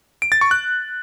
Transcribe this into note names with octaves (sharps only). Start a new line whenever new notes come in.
D7
A6
C#6
F#6